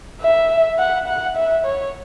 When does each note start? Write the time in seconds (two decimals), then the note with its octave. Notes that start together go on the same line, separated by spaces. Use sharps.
0.22 E5
0.78 F#5
1.07 F#5
1.36 E5
1.65 C#5